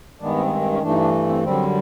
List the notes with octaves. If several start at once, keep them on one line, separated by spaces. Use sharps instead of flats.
G2 D#3 G#3 B3 D4
C4
B3
C4
C4
C#4
G2 E3 A3 D4
D#4
D4
C4
F#2 D3 G3 C4